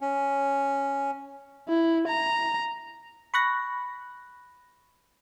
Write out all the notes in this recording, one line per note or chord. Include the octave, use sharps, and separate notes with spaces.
C#4
E4
A#5
B5 C#6 F#6 A#6